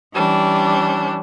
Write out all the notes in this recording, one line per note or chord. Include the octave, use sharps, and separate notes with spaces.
E3 G3 C#4 D4